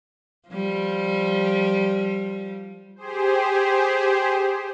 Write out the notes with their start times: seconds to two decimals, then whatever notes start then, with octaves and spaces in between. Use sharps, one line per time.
0.49 F3 G3
2.96 G4 G#4 C5